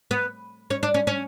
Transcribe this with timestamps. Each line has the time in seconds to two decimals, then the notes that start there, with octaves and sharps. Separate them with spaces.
0.11 B3
0.70 C#4
0.83 D4
0.94 C#4
1.07 C#4